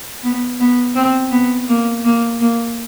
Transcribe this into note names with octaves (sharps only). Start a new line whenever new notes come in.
B3
B3
C4
B3
A#3
A#3
A#3